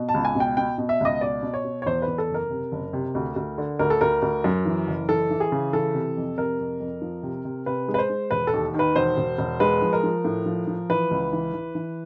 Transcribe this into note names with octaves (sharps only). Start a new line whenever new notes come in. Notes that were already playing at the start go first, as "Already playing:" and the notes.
Already playing: B2
A5
C#2
G#5
B2
G5
B2 G5
B2
E5
C#2 D#5
B2 D5
B2
C#5
B2
C#5
E2 C5
B4
E2
A4
F#1
A#4
C3
F#1
C3
D2
D2
D3
D2 A#4
A4
D2 A#4
D2
F#2
E3
F#1
E3 A4
E3
G#4
C#3
E3 A4
C3
F2
C3 A#4
F2
F2
F3
C3
C3
C3 B4
G#3
B4
C5
G#3
E1 B4
A4
D#2
D#3
B4
E1 C5
E1
E1
G#3 B4
F3
A#4
F3
A2
F3
F3
E3 B4
C#2
E3
E3
E3